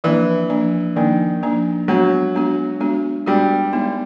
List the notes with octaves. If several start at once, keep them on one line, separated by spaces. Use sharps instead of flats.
E3 F3 A#3 D4
F3 A#3 D4
D#3 F3 A#3 D4
F3 A#3 D4
F#3 G#3 B3 D4 F#4
G#3 B3 D4 F#4
G#3 B3 D4 F#4
G3 G#3 B3 D4 F#4
G#3 B3 D#4